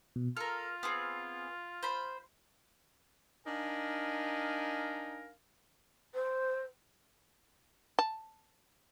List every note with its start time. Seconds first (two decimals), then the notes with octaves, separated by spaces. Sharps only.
0.16 B2
0.37 F4 A4 A#4 F6
0.83 B3 C4 G#4
1.83 C5 B5
3.47 D4 D#4 A#4 F5 G#5
6.14 C5
7.99 A5